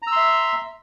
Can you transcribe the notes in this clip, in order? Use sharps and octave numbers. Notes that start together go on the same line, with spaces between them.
E5 A#5 C6 E6